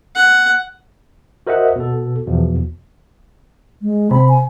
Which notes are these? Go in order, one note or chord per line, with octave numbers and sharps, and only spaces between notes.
F#5
F#4 A#4 C5 D#5 E5 F#5
B2 A4
E2 B2 F3
G#3
C3 B5
G#5